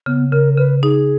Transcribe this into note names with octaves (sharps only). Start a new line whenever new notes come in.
C#3 B3
C#3 A#4
C#3 B4
D#4 G#4